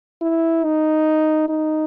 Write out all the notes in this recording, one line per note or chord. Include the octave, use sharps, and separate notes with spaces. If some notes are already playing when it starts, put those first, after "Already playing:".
E4
D#4
D#4